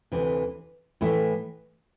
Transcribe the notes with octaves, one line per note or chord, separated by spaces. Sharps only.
D2 C3 E3
A2 E3 A3 E4